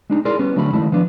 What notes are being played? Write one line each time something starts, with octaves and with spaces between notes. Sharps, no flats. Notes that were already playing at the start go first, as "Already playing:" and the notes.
G#3 D4 D#4
E4 G#4 A#4 D5 G#5 C6
G3 B3 C#4
D3 F#3 A3 F#4 B5
D#3 G#3 A3 E4
F3 B3 D4